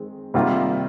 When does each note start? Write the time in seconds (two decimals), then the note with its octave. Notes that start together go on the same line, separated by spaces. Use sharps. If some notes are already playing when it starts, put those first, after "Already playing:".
Already playing: D#3 G#3 C4
0.34 C3 D#3 G3 A#3 F4